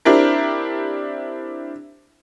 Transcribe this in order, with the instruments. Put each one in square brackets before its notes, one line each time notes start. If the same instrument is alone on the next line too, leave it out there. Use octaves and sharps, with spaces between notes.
[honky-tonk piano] C4 D4 E4 G4 A#4